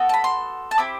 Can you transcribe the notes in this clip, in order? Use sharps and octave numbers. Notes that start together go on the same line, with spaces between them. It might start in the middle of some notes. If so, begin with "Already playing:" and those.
Already playing: B3 F#4 A4
A5
B5
C6
A5
C4 E4 G4 B5